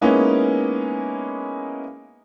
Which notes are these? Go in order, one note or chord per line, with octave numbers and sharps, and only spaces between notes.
G#3 A#3 B3 C#4 D#4 E4